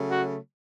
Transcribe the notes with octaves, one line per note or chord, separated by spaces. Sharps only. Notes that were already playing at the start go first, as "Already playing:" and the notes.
Already playing: C#3 F#3 A3
F#4